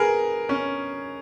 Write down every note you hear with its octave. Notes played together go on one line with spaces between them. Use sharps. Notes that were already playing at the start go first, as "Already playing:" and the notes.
Already playing: G#4 A#4 B4
C#4